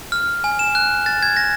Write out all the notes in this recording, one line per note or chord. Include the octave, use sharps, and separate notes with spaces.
F6
G#5
E7
F#6
A6
G#6
A#6